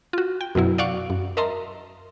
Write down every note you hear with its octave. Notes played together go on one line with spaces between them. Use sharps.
F4 F#4
G5
F#2 B2 F#3 E4
D5 F5 F#5 C#6 D6
F#2
A#4 D#5 E5 A5 A#5 C6